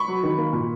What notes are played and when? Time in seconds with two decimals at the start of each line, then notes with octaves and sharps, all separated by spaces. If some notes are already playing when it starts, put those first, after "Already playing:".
Already playing: B5 C#6
0.08 F#3
0.23 D#3
0.38 A#3
0.53 A#2